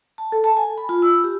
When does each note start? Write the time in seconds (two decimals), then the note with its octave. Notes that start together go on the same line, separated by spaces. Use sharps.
0.18 A5
0.32 A4
0.44 A5
0.57 G#5
0.78 B5
0.89 F4
1.02 E6
1.24 G4